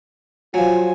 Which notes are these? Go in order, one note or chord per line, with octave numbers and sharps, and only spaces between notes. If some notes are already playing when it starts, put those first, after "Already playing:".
F3 F#3 F4 G#5